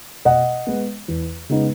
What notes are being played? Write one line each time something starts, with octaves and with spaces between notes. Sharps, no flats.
B2 D#5 F#5
G#3 B3
E2
C#3 G#3 B3 D#4